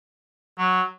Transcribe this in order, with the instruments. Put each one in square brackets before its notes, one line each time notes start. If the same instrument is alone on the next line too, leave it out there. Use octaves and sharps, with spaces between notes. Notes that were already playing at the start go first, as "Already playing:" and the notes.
[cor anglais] F#3